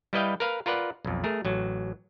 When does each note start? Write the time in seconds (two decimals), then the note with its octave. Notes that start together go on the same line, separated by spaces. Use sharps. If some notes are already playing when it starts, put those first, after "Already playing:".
0.13 G3 E4 B4 D#5 F5 G5
0.40 A#4 B4 F5
0.66 F4 A#4 B4 D5 F#5
1.05 B1 F2
1.24 A3 G#4 A#4
1.45 A1 F#3